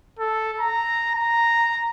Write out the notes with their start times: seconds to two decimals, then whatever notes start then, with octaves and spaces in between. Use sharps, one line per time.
0.19 A4
0.60 A#5
1.16 A#5